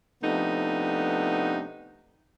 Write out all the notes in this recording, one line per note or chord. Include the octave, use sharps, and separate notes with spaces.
C3 F3 A3 B3 D4 D#4